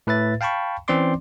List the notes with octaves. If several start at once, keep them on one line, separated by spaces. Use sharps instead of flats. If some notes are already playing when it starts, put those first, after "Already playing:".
A2 B4 E5 A6
F5 G5 A5 B5 C#6
E3 C4 C#4 D5 C6 D6